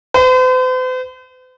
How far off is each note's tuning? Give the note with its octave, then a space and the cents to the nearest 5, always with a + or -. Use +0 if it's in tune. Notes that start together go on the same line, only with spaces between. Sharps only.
C5 -45